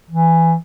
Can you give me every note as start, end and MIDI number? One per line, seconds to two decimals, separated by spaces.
0.10 0.55 52